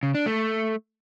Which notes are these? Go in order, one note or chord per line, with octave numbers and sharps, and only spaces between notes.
C#3
D4
A3